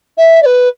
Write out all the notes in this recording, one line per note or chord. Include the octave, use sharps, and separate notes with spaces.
E5
D5
B4